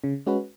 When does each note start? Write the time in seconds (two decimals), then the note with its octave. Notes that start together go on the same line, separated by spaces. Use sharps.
0.04 C#3
0.27 G#3 C#4 F#4 B4